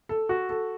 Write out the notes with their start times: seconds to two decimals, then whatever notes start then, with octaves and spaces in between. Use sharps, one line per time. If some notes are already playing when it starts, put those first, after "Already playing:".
0.09 A4
0.29 F#4
0.50 A4